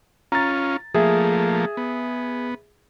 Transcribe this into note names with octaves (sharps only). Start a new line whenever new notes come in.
C#4 F4 A#5 A6
F3 A3 A#3 G#4 E5
B3